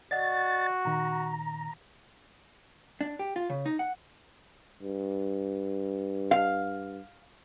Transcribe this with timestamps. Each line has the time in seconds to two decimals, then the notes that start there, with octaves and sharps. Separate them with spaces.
0.11 F#4 D5 D#5 F#5 A6
0.85 A#2 D#3 A#5
3.01 D4
3.19 G4
3.36 F4
3.49 C#3
3.66 D#4
3.79 F#5
4.83 G2
6.31 F5